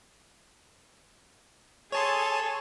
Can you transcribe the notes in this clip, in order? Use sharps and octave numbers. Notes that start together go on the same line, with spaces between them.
G#4 A4 C#5 G#5 A5 C6